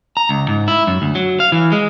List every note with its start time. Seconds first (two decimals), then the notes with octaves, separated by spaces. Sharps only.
0.17 A#5
0.29 C#2
0.49 G#2
0.68 E4
0.87 F#2
1.02 D2
1.15 F#3
1.40 F5
1.52 E3
1.72 G#3